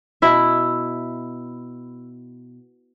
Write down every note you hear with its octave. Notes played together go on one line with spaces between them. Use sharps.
B2 E4 E5